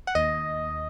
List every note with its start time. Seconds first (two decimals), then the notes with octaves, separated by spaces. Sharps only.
0.07 F#5
0.15 D#2 D#5